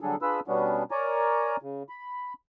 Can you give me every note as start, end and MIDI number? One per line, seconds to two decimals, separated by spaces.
0.01 0.16 50
0.01 0.16 54
0.01 0.16 55
0.01 0.16 62
0.01 0.16 68
0.01 0.16 69
0.22 0.40 62
0.22 0.40 65
0.22 0.40 68
0.22 0.40 71
0.22 0.40 83
0.22 0.40 88
0.48 0.83 47
0.48 0.83 55
0.48 0.83 59
0.48 0.83 61
0.48 0.83 62
0.91 1.56 70
0.91 1.56 73
0.91 1.56 74
0.91 1.56 80
0.91 1.56 82
1.62 1.83 49
1.89 2.33 83